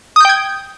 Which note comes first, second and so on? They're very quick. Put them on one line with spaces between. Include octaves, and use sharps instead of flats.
D#6 G6 G5 G#6